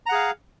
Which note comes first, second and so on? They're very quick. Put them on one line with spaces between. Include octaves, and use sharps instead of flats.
A#5 F#5 G#4 F5